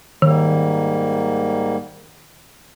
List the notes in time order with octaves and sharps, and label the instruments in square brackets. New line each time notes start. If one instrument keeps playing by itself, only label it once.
[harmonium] G#2 G3 A#3 [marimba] D#3